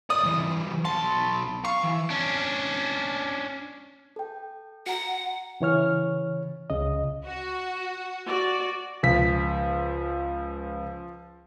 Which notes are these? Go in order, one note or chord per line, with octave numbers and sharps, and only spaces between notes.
D5 D#5 D#6
E3 G3
B1 A5 C6
F5 C#6
E3
C#4 D4
A4 G5
F#4 F#5 A#5
C#3 E3 C#5 F6
C#2 C#3 D#5
F#4
F#4 D5
C#2 F3 B6